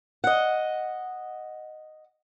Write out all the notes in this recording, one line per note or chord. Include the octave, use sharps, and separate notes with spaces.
D#5 F#5